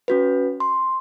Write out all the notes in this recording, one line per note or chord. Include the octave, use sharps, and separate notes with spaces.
C#4 F#4 B4
C6